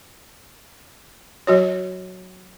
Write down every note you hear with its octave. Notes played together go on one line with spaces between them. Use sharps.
F#3 F#4 C#5